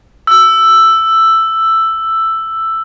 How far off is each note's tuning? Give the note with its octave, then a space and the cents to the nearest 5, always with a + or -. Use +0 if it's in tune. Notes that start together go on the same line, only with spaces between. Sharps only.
E6 +5